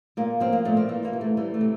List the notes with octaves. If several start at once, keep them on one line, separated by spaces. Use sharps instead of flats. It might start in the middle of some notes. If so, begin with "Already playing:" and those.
A#2 A#3
F3 C4
A#3
A#2 A3
C4
E3
A#3
C3
A3
E3 G3
A3
C3